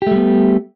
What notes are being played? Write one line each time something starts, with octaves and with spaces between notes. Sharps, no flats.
G3 A3 B3 G4